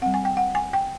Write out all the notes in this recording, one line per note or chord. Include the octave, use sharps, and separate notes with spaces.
G3 C4 F#5
G#5
G5
F#5
G#5
G5